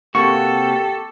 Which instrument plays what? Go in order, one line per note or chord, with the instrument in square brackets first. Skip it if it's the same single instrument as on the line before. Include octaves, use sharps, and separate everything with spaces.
[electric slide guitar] C3 A#3 F#4 [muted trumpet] G4 [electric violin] A4 [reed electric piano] C#6